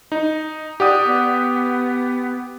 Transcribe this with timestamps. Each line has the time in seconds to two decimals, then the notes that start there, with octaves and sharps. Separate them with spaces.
0.12 D#4
0.80 G4 D5 F#5 D#6
1.07 B3